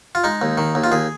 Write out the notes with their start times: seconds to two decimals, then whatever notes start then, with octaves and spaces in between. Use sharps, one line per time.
0.15 F4
0.24 G#3 D#4
0.42 D#2
0.58 D#3
0.75 D#2
0.84 F4
0.92 D#2 G#4